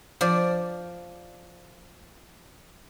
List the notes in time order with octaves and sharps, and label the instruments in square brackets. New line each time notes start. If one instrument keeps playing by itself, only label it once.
[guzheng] F3 D5